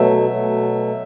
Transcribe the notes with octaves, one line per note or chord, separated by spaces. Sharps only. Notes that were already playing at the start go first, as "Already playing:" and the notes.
Already playing: B2 F#3 A3 E5
B2 F#3 A3